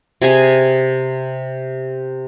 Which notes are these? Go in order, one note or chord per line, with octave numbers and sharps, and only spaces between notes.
C3 G#4 G#5